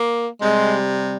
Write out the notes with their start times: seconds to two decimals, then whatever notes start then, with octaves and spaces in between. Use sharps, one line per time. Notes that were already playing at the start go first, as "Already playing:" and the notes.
Already playing: A#3
0.41 C3 G3 G#3